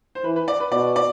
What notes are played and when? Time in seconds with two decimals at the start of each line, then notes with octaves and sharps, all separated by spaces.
0.15 C5
0.24 E3 B4
0.36 B4
0.48 D5
0.60 B4
0.72 B2 D5
0.96 D5